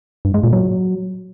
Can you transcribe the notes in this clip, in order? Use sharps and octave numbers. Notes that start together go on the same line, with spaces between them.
G2
G#3
A#2
F#3